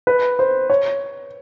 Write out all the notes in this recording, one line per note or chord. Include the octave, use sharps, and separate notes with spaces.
B4
C5
C#5